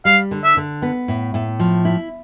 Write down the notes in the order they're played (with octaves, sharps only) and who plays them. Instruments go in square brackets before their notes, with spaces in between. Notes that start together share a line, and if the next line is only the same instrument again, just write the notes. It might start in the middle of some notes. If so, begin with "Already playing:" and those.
[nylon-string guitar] G3 [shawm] F5
[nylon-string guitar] D3
[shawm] E5
[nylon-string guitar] D3
B3
A2
A2
F3
E4